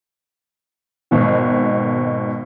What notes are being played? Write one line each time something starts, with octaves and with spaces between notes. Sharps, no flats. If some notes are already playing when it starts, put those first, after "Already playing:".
G#1 B2 D#3